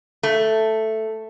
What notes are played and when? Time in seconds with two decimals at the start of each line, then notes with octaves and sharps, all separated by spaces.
0.23 A3